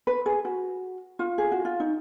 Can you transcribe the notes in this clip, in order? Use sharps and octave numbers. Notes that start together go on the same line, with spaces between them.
B4
G#4
F#4
F4
G#4
F#4
F4
D#4